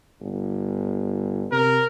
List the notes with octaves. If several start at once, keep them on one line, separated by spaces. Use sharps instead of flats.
G1
C3 A#4